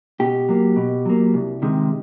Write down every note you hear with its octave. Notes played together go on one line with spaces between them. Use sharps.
B2 G4
F#3 A#3
B2
F#3 A#3
C2
C3 D#3 G#3